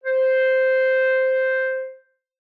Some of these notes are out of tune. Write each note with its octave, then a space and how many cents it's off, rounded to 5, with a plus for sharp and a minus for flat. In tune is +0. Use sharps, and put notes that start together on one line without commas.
C5 -5